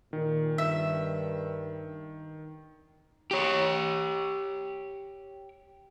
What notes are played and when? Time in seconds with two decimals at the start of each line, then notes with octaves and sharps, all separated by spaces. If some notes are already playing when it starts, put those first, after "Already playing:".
0.13 A#2 D#3
0.58 G2 E5
3.31 G4 C#5